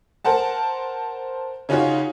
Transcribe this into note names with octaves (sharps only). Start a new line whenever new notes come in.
A#4 C5 F#5 A5
C#3 C#4 D#4 F4 F#4 C#5